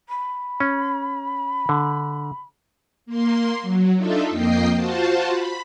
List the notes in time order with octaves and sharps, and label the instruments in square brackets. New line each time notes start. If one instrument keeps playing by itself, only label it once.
[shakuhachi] B5
[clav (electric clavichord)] C#4
D3
[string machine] A#3 C6
F#3
D4 D#4 F4 A4 E5
F2 A#3 D#5 G5 C7
F4 F#4 C5 A5
B5